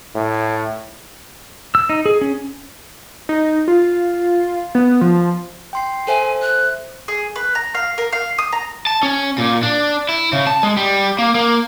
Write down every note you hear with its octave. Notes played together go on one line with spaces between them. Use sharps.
A2
E6
D#4
G#4
C#4
D#4
F4
B3
F3
G5 C6 C7
A4 C5 E5 G#5
F#6
G#4
B4
A#5
F5
A#4
F5
D#6
A#5
A5
C#4
A#2
D4
E4
C#3
A5
G#3
G3
A#3
A#3